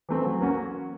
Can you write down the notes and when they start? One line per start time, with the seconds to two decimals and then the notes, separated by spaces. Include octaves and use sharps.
0.09 E3 A3 C4
0.25 F#3
0.41 A#3 C#4 F#4